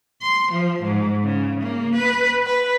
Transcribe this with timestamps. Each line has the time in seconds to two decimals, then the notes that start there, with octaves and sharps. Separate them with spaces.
0.21 C6
0.52 F3
0.83 G#2
1.24 C#3
1.60 A#3
1.95 B4
2.46 B4